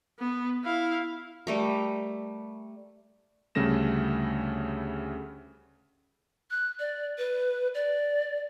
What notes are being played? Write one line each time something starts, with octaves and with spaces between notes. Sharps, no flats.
B3
E4 F5
G3 A3 A#4
D2 C#3 G3 A3 A#6 E7
F#6
D5
B4
D5